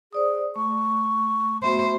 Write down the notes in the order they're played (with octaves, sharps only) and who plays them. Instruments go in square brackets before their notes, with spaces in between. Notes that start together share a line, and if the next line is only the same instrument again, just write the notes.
[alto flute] G#4 [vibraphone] C5 D5 D#6
[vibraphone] A3 [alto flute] C#6
[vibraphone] A3 B3 F#4 [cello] C5 [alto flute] E5